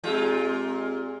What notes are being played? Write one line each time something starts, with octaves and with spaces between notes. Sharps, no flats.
A#2 G#3 C4 F4 G4